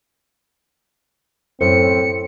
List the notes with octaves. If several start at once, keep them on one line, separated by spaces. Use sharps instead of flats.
F#2 A2 C4 C5 C#7